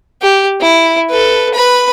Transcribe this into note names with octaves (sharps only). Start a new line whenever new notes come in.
G4
E4
A4 B4
B4 B5